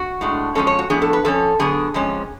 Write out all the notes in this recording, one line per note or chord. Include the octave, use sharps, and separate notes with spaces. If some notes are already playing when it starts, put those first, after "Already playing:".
Already playing: F#4
A2 G#3 D4
F2 F3 G#3 C#4 A4
C#5
F#4
A2 F3 B3 D4 G#4
A4
B4
F2 F3 C#4 A4
D3 F#3 B3 D4 G#4
F2 F3 G#3 C#4